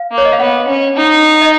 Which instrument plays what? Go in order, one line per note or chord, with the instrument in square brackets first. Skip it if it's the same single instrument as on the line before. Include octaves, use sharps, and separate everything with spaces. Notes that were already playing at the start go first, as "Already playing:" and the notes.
Already playing: [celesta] F5
[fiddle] A#3
[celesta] C#5
D#5
F5
[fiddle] B3 [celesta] F#5
[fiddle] C#4
D#4
[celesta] D#5